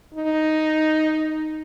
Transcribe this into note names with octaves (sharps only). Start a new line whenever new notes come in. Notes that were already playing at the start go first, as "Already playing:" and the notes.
D#4